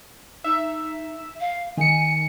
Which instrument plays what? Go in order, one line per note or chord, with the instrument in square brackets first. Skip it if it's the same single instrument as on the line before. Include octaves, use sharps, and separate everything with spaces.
[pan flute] D#4 [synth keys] E5
[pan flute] F5
[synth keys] D#3 C#7 [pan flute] G#5